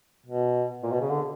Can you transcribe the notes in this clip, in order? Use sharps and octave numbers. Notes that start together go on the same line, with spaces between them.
B2
A#2
B2
C#3
D3